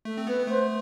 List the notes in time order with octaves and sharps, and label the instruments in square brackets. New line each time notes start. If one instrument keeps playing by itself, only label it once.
[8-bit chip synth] A3 [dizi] A4
[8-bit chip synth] C4
[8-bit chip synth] B3 [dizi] B4
[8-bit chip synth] B3
[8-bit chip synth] A3 [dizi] C5